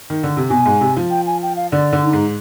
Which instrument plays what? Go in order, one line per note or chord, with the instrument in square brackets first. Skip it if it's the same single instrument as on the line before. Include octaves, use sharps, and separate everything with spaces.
[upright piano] D#3
D3
C3
[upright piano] B2 [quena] G#5
[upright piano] G#2
C3
F3
[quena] G5
G#5
G5
F5
[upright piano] D3 [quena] D5
[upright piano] D3
[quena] D#4
[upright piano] G#2